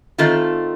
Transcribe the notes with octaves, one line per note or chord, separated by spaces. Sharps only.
D#3 A3 C4 F4